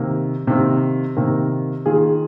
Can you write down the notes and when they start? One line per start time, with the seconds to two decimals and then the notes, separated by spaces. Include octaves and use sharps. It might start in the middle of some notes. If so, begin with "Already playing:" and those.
Already playing: C3 D#3 A#3
0.47 C3 D#3 A#3
1.17 C3 D#3 A#3
1.86 D#3 A#3 F4 G#4